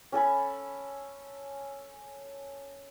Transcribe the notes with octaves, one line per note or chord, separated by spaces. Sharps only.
C#4 A4 G#5 B5